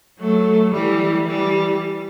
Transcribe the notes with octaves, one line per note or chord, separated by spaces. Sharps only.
F#3 A3
E3 G3
E3 G3